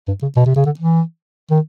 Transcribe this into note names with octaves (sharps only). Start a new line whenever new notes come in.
G2
C#3
B2
C3
C#3
D3
E3
D#3